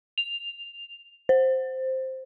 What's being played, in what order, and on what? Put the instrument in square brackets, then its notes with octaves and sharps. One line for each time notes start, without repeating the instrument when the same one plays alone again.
[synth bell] F7
C5